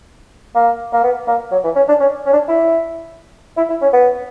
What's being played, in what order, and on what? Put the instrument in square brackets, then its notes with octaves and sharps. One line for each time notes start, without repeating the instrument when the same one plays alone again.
[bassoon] A#3
A#3
B3
A#3
F#3
E3
C#4
D4
C#4
C#4
D4
E4
E4
E4
C#4
B3